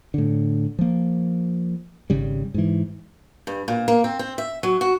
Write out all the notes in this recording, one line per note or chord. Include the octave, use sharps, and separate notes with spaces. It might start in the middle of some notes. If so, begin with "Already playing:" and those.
A2 D3
F3 A#3
G#1 C#3 G3
G#2 E3
G2
A#2
A#3
C4
C4
E5
F#3
F#4